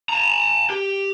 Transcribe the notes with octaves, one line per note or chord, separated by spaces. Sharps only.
A5 A#5
G4